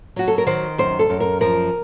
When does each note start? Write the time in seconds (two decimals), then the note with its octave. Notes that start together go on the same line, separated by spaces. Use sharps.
0.16 F#3 F#4
0.28 A4
0.38 A#4
0.47 D#3 C5
0.78 F#2 C5
0.99 A4
1.10 F#2
1.20 A#4
1.41 F3 A#4